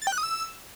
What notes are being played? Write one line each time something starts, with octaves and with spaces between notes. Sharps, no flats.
A6
G5
F#6
D#6
E6